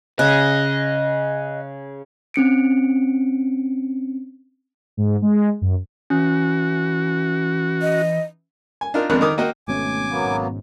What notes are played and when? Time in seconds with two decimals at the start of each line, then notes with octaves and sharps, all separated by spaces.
0.19 C#3 D#5 F#6
2.34 C4 C#4 C#7 D7
4.97 G#2
5.22 G#3
5.61 F#2
6.10 E3 C#4 F#4
7.82 D#5
8.81 G#5
8.94 D4 D#4 F4 A#4
9.10 G#1 F2 B3 D4 A#4 F#6
9.21 D#3 A#4 D6 D#6
9.38 A#3 F#4 D#5 G5
9.68 G#1 B2 A3 C#4 G#5 D6
10.10 F#3 A#3 B3
10.23 G#2